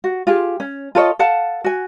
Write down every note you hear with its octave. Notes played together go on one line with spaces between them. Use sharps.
F#4
F4 G4 G#4
C#4
F4 A4 C#5 D#5
A4 F5 F#5 A5
F#4 G#5